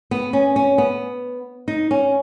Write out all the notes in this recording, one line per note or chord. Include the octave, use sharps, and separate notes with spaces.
B3
C#4
C#4
B3
D#4
C#4